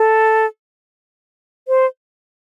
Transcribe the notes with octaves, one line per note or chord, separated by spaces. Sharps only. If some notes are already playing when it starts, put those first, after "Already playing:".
Already playing: A4
C5